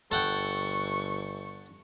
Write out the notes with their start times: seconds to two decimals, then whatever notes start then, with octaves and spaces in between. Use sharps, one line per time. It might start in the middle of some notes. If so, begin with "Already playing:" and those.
0.11 G1 A4 F#5 G5 C#6